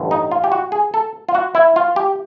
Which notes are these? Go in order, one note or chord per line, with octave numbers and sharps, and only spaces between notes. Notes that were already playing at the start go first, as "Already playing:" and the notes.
Already playing: A1 G2 D3
D#4
F4
G4
F#4
G#4
A4
F4
F#4
E4
F4
G4